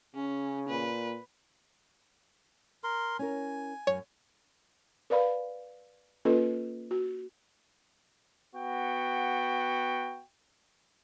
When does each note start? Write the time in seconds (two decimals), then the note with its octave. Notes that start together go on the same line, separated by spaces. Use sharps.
0.15 C#3 C#4
0.70 A#2 B4
2.84 A#4 C6
3.19 C#4 E4 A#4 G#5
3.87 F#2 C#5
5.10 A#4 B4 D5 F5 B5
6.25 A#3 C#4 F4 A4 B4 D#5
6.91 F#4
8.56 B3 F#4 G5